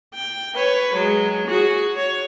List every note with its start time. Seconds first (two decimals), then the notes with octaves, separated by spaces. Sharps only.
0.14 G5
0.55 B4 C#5
0.94 F#3 G#3
1.47 F#4 G#4
1.95 C#5